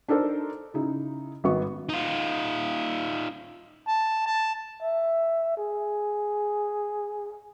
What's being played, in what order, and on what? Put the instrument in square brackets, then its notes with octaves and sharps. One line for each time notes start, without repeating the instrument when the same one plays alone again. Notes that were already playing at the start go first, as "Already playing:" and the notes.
[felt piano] D4 D#4 A4 A#4 C5
C#3 D#4 E4
G#1 D#3 B3 C#6
[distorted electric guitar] D#4 F4
[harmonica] A5
A5
[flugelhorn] E5
G#4